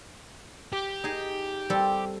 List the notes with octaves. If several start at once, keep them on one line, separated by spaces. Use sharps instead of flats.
G4
D#4 G#4
G3 C4 A4